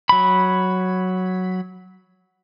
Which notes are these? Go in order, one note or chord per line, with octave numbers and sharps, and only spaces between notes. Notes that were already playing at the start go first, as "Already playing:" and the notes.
F#3 B5